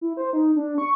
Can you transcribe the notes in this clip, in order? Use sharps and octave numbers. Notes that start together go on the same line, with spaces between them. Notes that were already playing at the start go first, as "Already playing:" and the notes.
E4
C5
D#4
D4
C#6